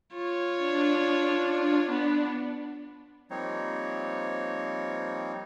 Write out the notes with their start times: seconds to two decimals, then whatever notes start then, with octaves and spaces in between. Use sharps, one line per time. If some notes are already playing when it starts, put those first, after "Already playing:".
0.14 F4 C#5
0.56 D4
1.89 B3
3.31 F3 G3 A#3 C4 D#4 C#5